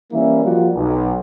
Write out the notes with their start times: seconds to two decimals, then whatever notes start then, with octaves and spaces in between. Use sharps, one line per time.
0.12 E3 G3 A#3 C#4 E4
0.43 F3 G3 A#3 F4 F#4 D#5
0.75 B1